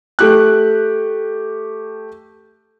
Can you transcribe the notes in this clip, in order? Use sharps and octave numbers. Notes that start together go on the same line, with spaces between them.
A3 G4 F#6